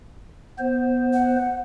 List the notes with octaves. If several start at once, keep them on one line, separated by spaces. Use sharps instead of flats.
B3 C5
F#5